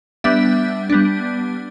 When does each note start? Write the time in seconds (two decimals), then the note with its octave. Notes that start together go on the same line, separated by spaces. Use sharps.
0.24 G3 B3 D4 E5
0.90 G3 B3 D4